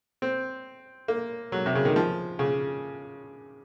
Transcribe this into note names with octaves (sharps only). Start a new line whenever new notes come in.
C4
A#3
F#3
C3
C#3
D#3
F3
C#3